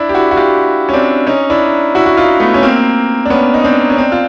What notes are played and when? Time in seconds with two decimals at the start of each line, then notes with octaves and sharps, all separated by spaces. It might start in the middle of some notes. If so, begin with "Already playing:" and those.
Already playing: D4 E4
0.09 G4
0.15 E4 F#4
0.31 F#4
0.37 F4 G4
0.89 C#4
0.93 C4 D4
1.27 C#4 D#4
1.50 D4 E4
1.95 E4 F#4
2.06 F#4
2.17 D#4 F4
2.40 A3 B3
2.54 C#4
2.63 A#3 C4
3.25 D4
3.30 B3 C#4
3.54 D#4
3.64 C4 D4
3.90 C#4
3.98 C4 D4
4.12 F4